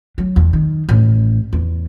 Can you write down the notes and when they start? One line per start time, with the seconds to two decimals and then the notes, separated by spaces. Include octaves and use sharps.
0.18 F#3
0.36 E2
0.53 D#3
0.89 A1
1.53 E2